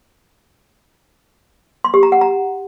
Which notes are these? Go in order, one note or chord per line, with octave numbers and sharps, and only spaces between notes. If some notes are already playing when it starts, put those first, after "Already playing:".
C6
G4
A#5
F#5
A#5